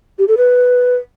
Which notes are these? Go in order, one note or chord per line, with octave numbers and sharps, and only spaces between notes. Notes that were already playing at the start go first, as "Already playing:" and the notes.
G4
A4
B4